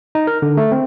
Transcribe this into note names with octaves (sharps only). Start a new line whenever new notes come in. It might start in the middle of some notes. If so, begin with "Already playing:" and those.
D#4
A#4
D3
A3
C4